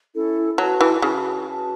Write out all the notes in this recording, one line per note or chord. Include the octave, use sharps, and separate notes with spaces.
C#4 E4 A4
F#3 F#4 B4 A5
E3
C#3 F#4 B4 A5
F#4 B4 A5